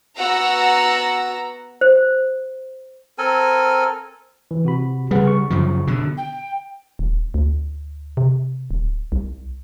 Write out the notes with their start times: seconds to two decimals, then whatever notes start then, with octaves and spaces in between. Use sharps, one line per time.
0.18 B3 F#4 F#5 A#5 E6
1.81 C5
3.18 C4 A4 A#4 G#5
4.51 E3
4.65 C3 F#4 B5
5.11 C#3 G3 G#4 B4 F#5
5.27 C#6
5.50 F#2 C#3 F3
5.87 B2 D3
6.17 G5
6.99 D#1
7.34 D2
8.17 C3
8.71 D1
9.12 C2